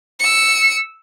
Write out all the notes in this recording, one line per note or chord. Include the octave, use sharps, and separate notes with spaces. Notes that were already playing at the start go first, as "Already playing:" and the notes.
E6 C#7